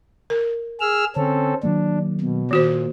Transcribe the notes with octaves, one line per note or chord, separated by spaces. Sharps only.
A#4
G#4 E6 F6
D3 C4 C#4 A4
D#3 F#3 A#3 D4
B2
A#2 D#3 F#4 C5